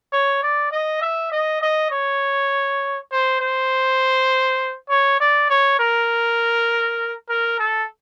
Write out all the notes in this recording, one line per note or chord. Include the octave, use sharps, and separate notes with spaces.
C#5
D5
D#5
E5
D#5
D#5
C#5
C5
C5
C#5
D5
C#5
A#4
A#4
A4